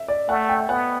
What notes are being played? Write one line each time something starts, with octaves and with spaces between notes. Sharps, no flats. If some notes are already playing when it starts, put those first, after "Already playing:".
Already playing: E5
D5
A3 F#5
G5
B3 F#5